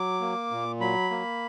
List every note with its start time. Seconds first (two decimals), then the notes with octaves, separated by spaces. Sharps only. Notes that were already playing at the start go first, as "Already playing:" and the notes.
Already playing: F#3 D6
0.21 A#3
0.51 A#2
0.80 F#3 B5
1.11 A#3